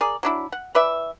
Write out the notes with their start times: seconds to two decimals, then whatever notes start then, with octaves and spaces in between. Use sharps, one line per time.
0.01 G#4 A#4 D5
0.23 F#3 D4 E4
0.52 F#5
0.75 E3 B4 D5 E5